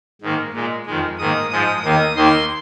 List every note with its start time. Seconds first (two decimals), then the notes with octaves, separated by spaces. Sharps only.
0.22 G#2 D#3 A#3
0.54 A#2 G#3
0.86 F2 D#3 G#3
1.19 G#2 D#3 A#3 D#6
1.51 G#2 F3 G#3 D#6
1.83 D#2 D#3 A#3 D#6
2.16 D#2 D#3 A#3 C6